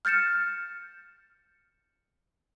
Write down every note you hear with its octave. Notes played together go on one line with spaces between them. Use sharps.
F6 G6 A6 C#7 E7